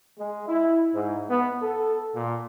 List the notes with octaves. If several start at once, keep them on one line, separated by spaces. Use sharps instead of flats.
G#3
E4
G#2
B3
A4
A#2